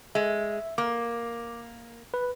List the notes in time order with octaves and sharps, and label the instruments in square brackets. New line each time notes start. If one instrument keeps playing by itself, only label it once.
[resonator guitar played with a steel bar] G#3 [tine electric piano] E5
[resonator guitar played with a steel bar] A#3 [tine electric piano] D6
[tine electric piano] B4